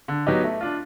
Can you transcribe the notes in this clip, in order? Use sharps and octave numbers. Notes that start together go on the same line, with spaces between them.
D3
F#3 B3 D#4 G4
A3
D4 F4